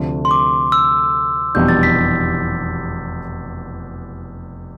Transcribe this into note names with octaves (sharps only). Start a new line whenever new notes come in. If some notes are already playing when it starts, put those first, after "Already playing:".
Already playing: D2 C3 F3 A3 D4
C6
D6
E6
F1 E2 B2 G3 D4 G6
A6
B6